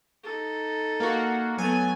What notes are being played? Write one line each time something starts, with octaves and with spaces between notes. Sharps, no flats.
D#4 A4
A#3 F#4
F#3 A3 B3 G#5